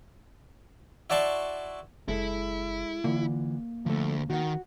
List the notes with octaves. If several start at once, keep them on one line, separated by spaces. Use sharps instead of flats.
E4 F#4 D5 A5 C6 C#6
F#1 G#3 E4 A4
D3 E3 A#3 F4
D2 F3 A3
D#3 F#4 F#5